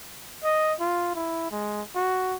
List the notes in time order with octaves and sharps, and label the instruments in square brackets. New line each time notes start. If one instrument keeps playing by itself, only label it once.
[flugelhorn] D#5
F4
E4
G#3
F#4